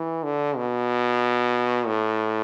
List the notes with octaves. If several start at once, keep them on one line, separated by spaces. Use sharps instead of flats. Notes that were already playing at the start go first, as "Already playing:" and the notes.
Already playing: E3
D3
B2
A2